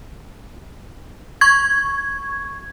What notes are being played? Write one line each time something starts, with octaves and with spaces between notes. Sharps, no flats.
C#6 G#6